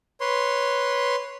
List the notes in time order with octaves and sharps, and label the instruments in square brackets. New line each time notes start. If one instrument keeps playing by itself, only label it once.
[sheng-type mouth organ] B4 C#5 C6